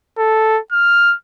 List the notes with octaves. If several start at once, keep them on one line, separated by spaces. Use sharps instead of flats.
A4
F6